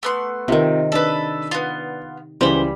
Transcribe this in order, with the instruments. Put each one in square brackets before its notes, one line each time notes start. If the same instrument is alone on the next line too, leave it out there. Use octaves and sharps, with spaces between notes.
[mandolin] A3 B3 C6
[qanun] C3 D#3 [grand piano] C4 F4 A#4
[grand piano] D4 [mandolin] A4 B4
[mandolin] B3 F4
[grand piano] C#2 C#3 E3 [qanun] G3 B5 [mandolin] C5